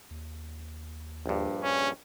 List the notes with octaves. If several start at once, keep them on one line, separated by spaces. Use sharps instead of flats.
D#2
A#1 G2
C#4